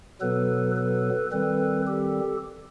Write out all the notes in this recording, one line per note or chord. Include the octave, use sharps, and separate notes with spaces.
B2 F#3 B3 A4 B4
A4 B4
D#3 G3 C4 A4 B4
G4 A4